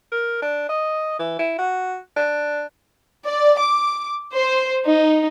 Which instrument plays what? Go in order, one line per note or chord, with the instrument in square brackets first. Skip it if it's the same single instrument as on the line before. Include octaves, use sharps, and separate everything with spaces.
[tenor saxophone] A#4
D4
D#5
E3
E4
F#4
D4
[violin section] D5
D6
C5
D#4